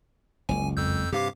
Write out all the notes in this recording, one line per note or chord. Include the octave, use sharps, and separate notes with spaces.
F#1 C#2 G#5
F2 E6 G6
G2 C3 G4 F5 D6